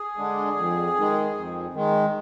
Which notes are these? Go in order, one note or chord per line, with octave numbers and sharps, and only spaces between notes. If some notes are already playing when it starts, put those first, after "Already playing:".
Already playing: G#4
D3 G#3 D4
F2
D#3 G#3
F2
D#3 G#3